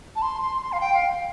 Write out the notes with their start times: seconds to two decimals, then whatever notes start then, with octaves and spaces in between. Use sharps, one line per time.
0.16 A5
0.22 C6
0.42 C6
0.61 C6
0.72 F5
0.81 G5
0.94 F5